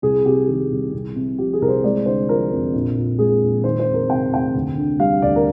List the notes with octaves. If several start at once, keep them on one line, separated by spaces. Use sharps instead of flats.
C2 G#4
C3 G4
D#3 G#4
C2
C2
C3
F3 G4
G#4
C2 A#4
C5
G#3 D5
D3 C5
F3 A#4
F2
A#1
A#2
G#3 G#4
A#1
D#3 C5
C5
F2
A#4
C3 G5
F1 G5
D2
D3
G3 F5
D2 D5
A#4